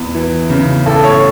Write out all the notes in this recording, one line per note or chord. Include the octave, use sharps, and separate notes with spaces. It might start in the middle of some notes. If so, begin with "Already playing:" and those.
Already playing: E2
E3
C#3
A1 A4
C#5